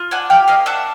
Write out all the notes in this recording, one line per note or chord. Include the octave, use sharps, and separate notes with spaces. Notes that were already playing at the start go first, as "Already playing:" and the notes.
Already playing: F4
D4 F#5 G#5
G4 F5 G5
A#3 D#5 F5
D4 E5 F#5